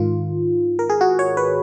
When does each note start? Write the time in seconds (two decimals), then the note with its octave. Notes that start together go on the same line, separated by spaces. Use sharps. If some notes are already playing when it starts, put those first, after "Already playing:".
Already playing: G#2 D#3 F4
0.79 A#4
0.90 G#4
1.01 F#4
1.19 C#5
1.37 B4